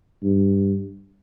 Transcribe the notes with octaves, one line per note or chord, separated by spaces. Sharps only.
G2